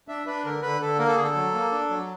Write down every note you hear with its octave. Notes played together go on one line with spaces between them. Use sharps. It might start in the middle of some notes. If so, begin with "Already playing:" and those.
D4 E5
D4 B4
D3 A#4
D3 B4
D3 A4
A#3 A#4
A4
D3 G#4
A4
F#3
A#3
D4
F#3